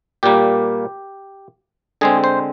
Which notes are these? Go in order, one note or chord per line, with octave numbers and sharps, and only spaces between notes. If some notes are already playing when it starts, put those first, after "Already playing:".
A#2 G3 A#3 G4
D3 G#3 C4 G#4
C5